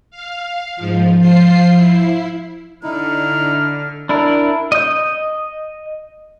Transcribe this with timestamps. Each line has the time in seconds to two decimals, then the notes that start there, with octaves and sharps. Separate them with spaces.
0.11 F5
0.76 G#2 F3
1.19 F3 F4 C5 C7
1.73 E4
2.83 D3 D#4 E4 F6
4.09 D4 E4 A#4
4.72 D#5 G6